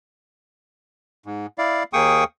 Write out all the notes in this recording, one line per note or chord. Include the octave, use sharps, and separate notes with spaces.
G#2
E4 D5 F5
D#2 A#3 G#4 G5 C#6 D#6